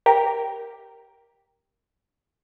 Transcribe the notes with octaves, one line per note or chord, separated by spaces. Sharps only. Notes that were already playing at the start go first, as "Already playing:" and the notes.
G4 A#4